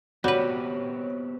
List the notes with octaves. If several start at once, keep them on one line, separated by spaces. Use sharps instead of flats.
G3 B3 C4 F#4 G4 B4 C#5